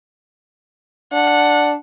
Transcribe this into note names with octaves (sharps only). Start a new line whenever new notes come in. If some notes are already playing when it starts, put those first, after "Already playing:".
D4 F#5